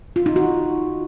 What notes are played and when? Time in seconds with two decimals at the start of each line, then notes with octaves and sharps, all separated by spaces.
0.16 F4
0.26 D#4
0.36 F#4